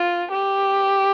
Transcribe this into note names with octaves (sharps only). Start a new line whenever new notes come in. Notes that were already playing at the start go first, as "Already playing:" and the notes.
Already playing: F4
G4